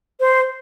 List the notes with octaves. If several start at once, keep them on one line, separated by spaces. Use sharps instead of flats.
C5